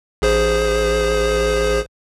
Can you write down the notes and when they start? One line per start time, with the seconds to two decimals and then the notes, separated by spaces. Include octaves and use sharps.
0.22 A1 G#4 C5